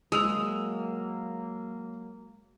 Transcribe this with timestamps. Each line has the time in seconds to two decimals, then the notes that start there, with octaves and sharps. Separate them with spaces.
0.12 F#3 G#3 A#3 D#6 E6 F7